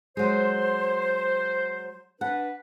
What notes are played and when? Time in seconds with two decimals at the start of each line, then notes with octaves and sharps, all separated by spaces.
0.17 F#3 G#3 C5
2.21 D4 B4 F#5